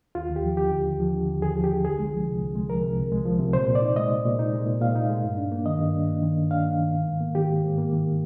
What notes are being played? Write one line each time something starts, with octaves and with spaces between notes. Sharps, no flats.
D#2 F4
D#2
G4
F3
D3 G4
D#2
D#2
F3
D3
D#2
D#2 G#4
F3
G4
D3
C2 G#4
G#3
F3
C3
C2
G#3
F3 A#4
C3
C2
G#3
F3
C3
A#2 C5
A#2
D5
D#4
G#3 D#5
A#2
A#2
D#4
G#3
A#2
A#2 F5
D#4
G#3
G2
D4
A#3
D#3 D#5
G2
D4
A#3
D#3
G2
D4 F5
A#3
D#3
G#2
G#2
A#3
D#3 G4
G#2
G#2
A#3
D#3